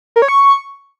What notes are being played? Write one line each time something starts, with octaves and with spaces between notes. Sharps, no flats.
A#4
C#5
C#6